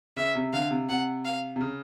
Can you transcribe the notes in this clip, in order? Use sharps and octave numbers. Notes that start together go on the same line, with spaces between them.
C#3 E5
C3
D3 F5
C3
C3 F#5
F5
C3
C#3